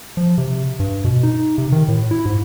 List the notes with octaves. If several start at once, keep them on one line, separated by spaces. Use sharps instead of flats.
F3
C3
G2
B2
D#4
C3
D#3
A2
E4
G#2